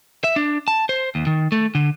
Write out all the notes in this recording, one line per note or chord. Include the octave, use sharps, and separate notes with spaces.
E5
D4
A5
C5
D#2
D#3
A3
D3